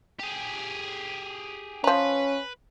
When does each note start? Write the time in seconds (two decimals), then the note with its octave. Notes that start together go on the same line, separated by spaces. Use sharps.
0.20 G4 G#4
1.84 F3 C#4 B4 A#5